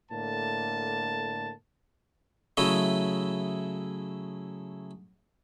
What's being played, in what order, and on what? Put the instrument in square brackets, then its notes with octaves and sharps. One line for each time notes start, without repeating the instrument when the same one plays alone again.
[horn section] A2 D3 A#3 A5
[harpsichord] C#3 F#3 A3 E4 C#5 D#5